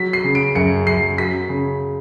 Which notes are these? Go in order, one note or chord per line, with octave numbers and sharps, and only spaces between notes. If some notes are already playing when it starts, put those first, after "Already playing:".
Already playing: F#3 B6
C7
C#3
D7
F#2 C#7
F#2 C7
F#3 B6
C#3